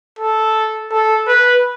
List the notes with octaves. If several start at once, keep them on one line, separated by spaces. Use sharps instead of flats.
A4
A4
B4